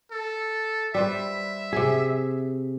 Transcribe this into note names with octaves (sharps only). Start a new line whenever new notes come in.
A4
G3 B4 C5 E5
C3 G#4